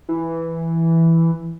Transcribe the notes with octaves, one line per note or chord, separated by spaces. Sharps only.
E3